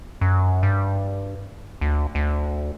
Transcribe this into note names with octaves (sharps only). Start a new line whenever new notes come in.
F#2
G2
D2
D2